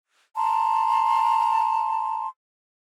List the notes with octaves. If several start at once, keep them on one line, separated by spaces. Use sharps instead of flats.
A5 A#5 C6